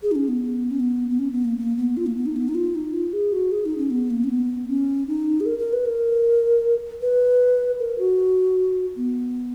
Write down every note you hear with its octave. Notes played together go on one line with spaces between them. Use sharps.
G#4
D#4
C#4
B3
C#4
B3
B3
C#4
B3
A#3
A#3
B3
F4
A#3
B3
D#4
B3
D#4
F4
D#4
F4
G#4
F#4
G#4
D#4
C#4
B3
A#3
C#4
B3
C#4
D#4
G#4
A#4
A#4
B4
A#4
B4
A#4
F#4
B3